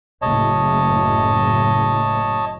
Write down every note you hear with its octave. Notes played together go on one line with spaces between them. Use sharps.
F#1 A2 C#5 D#5 A5